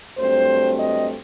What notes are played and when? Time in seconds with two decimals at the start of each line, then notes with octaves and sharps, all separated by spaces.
0.18 G2 F#3 A3 C4 C5
0.79 D#5